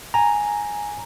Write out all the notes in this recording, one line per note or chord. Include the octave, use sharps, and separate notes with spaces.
G#5 A#5